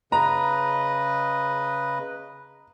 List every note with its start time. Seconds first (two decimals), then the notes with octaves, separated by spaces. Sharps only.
0.12 C#3 B4 D#5 A#5